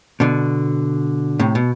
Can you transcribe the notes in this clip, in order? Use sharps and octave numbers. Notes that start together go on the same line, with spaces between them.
B2 D3
A2 C3
B2